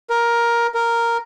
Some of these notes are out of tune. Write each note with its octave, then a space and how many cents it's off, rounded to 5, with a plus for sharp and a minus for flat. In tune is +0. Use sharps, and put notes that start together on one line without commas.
A#4 +10
A#4 -5